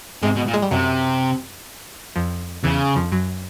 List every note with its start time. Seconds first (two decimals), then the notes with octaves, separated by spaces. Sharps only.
0.22 G#2 C3 G#3
0.35 B2
0.47 A#2
0.54 G#3
0.62 G3
0.71 F#2 C3 F#3
2.16 F2 F3
2.64 E2 C#3 E3
2.96 F2 F3
3.12 F#2 F#3